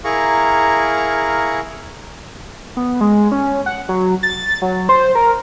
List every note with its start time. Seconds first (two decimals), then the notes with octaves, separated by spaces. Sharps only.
0.04 E4 G#4 A#4 F5 A#5 C#6
2.77 B3
3.01 G#3
3.32 C#4
3.66 F#5
3.89 F#3
4.23 A6
4.62 F#3
4.89 C5
5.15 A#4